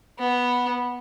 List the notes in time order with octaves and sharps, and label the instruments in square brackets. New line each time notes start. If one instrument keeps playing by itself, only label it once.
[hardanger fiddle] B3